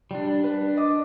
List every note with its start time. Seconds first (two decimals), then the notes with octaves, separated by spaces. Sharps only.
0.11 G3 D4
0.44 D4 B4
0.77 D#5 D6